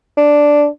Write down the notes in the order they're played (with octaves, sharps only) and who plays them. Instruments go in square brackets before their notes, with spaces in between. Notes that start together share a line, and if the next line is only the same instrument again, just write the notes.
[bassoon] D4